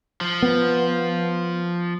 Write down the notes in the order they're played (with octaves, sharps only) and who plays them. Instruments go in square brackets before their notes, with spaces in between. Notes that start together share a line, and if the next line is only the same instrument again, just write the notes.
[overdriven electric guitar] F3
[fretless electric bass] B3